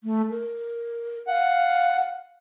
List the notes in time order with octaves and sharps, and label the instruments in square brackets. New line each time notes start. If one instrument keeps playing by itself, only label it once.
[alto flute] A3
A#4
[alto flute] F5 [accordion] F#5